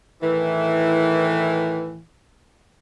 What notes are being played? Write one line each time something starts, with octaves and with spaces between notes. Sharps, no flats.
A2 D#3 E3